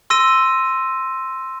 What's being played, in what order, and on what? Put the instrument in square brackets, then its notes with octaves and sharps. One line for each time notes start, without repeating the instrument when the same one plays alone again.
[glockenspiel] C6 E6 A#6 D#7